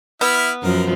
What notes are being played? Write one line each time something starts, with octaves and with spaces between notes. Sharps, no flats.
B3 E4 E5 F6
F#2 F3 A#4